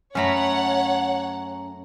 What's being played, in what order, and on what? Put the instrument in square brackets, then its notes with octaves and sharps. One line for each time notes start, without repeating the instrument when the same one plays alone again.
[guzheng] F#2 A3 B5 [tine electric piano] C#4 A#5 [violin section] C#5 F#5